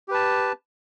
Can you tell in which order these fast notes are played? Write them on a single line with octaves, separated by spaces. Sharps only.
G4 B4 A5